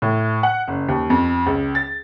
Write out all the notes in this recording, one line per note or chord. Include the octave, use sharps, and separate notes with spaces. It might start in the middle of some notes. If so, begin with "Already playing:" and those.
A2
F#5
F#1
D#2
F2
C#2
A6